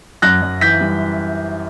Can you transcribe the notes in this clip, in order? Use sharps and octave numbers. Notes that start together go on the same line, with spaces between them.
F#2 F#6 A#6
F#2
E3 G6 B6
G3